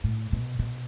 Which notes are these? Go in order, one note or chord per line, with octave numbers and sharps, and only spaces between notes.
A2
B2
B2